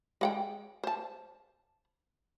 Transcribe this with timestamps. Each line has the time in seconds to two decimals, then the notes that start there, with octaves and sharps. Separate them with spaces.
0.21 G#3 F#5 G5
0.84 C5 A5